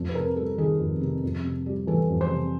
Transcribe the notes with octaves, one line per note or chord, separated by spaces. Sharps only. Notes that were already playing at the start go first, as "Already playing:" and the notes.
Already playing: F2
B4
C3 A#4
G3 A4
D#3 G#4
F2
C3
F2
C3
G3
E3 A4
F2
C5
C3